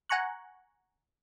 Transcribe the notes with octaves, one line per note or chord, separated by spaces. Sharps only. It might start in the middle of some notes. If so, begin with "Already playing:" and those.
F#5 G#5 A#5 C#6 F#6